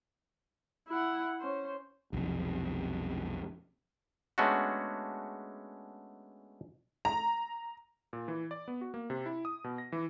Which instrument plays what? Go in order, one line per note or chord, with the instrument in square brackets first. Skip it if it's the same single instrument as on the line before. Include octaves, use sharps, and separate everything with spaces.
[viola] E4 F#5
C#4 C5
[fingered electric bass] B1 F2 C3
[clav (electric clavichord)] G#3 A3 B3 C#4 D4 F#4
[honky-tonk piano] A#5
[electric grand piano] A#2
E3
D5
B3
F#4
A#3
C3
E4
D#6
B2
A#6
E3